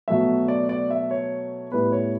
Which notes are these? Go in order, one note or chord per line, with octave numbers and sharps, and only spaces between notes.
B2 F#3 A3 E5
D5
D5
E5
C#5
A2 G3 B3 B4
C#5